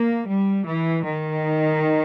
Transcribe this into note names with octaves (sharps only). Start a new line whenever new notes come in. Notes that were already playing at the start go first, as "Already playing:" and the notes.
Already playing: A#3
G3
E3
D#3